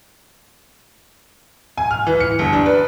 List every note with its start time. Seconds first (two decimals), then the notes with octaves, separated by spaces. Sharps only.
1.78 G#5
1.91 F6
2.07 E3
2.20 C#7
2.39 G1
2.53 D4
2.66 B4